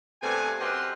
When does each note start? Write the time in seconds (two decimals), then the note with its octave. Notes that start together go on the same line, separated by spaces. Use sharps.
0.22 G2 C3 A3 B3 G#5
0.59 F#2 C4 G4 B4 D#5 C6